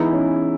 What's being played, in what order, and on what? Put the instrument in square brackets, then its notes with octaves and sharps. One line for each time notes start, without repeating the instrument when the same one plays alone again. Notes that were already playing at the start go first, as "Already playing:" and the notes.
Already playing: [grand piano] E3 E4 [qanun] G#3 B3 D#4
[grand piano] C#4